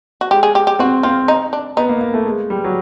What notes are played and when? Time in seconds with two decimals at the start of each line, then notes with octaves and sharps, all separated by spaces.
0.21 F#4
0.31 G#3 G4
0.43 G#4
0.55 G4
0.67 G4
0.79 C4 F#4
1.03 C4 F4
1.28 D#4
1.53 D4
1.77 B3 D#4
1.89 A#3
2.01 A#3
2.14 A3
2.26 G#3
2.50 G3
2.64 F#3